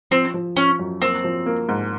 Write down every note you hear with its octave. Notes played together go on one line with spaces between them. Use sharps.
F3 C4
F3
F3 C#4
F#2
A#3 C4
F3
A#3
G#2